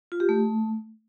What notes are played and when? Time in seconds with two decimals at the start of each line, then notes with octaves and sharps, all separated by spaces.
0.12 F4
0.20 G4
0.29 A3